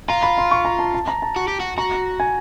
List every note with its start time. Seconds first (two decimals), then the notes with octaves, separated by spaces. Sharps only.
0.08 F4 A#5
0.23 B5
0.38 C6
0.51 C#6
0.65 A#5
0.79 A5
0.94 A5
1.08 A#5
1.22 A5
1.36 F#4
1.48 G4
1.60 F#4
1.78 F#4 A#5
2.20 G#5